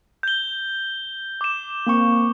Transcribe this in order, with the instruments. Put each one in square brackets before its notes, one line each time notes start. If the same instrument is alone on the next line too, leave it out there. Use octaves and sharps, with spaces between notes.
[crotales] G6 G7
D6 E7
[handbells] A#3 C4 C#6